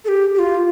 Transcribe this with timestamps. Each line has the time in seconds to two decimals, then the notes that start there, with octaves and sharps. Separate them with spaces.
0.05 A4
0.08 G4
0.35 G4
0.39 F4